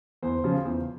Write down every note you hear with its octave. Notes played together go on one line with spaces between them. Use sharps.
E2 C5
C#3 F3
E2